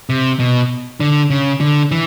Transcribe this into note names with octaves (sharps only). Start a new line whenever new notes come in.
C3
B2
D3
C#3
D3
E3